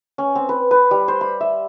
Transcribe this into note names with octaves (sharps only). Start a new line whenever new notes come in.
C#4
C4
B4
B4
G3
C5
B5
E5